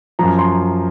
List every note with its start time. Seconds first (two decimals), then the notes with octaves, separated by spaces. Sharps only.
0.19 F#2 F3 A#5
0.39 C6